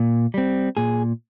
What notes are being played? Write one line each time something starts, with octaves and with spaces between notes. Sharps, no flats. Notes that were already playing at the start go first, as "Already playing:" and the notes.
Already playing: A#2
G3 C4
A#2 G#4